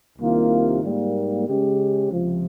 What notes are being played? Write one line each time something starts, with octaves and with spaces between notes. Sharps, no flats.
C2 C3 D#3 A#3 F4
G#2 G3 A#3
C#3 G#3 C#4 G4
C#2 C3 F3